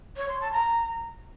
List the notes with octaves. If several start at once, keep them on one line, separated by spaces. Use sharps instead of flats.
C#5
C6
A5
A#5